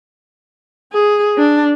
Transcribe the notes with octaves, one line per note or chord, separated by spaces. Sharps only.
G#4
D4